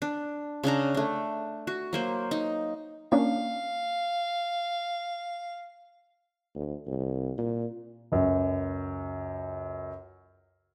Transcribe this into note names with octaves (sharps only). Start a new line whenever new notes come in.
D4
C#3 C#4 D4 A#5
A3 D4
F#4
F#3 A#3 C5
D#4
A#3 C#4 D4 F5
D2
C2
A#2
C#2 F#2